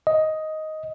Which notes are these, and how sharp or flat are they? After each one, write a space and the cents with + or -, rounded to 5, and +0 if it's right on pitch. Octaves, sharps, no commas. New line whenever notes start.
D#5 +10